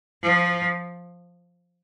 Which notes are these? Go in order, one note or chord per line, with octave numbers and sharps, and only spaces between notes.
F3